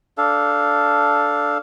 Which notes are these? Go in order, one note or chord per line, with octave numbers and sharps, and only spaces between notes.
D4 A4 F5